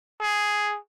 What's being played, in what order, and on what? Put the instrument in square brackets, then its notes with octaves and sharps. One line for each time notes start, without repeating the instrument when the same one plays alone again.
[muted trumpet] G#4